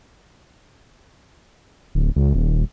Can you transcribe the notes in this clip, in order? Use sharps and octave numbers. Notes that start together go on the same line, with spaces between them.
D1
C#2
D#1